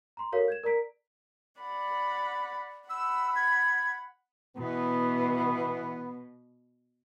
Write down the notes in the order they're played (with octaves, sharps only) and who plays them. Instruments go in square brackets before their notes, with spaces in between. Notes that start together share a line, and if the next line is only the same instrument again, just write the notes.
[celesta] A#5 C6
F#4 A4 A#4 C#5 F5
G6 G#6 E7
A#4 D5 A#5 B6 D7
[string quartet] D5 F#5 B5
[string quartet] F#5 B5 [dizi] E6
[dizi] G#6
[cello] B2 [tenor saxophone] E3 [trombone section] B3